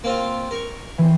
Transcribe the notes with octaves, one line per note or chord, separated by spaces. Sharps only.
A#3 C4 F4
A#4 C#6
E3 C4